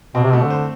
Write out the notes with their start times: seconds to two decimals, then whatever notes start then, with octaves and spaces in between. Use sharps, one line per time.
0.15 B2 C4
0.23 C3
0.32 B2 A3
0.42 D3
0.50 C5